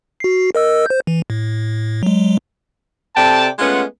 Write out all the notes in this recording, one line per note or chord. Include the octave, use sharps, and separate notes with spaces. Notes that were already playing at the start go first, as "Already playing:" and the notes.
F#4 C7
A#4 D#5 E6
C5 G6
E3
A2
F#3 G#3
C3 A4 D5 G5 A5
G#3 A3 B3 C#4 F4 F#5